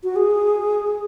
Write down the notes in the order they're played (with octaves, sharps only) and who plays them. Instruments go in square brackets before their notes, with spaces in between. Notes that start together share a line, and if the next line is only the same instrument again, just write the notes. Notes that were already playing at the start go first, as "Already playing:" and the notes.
[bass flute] F#4
G#4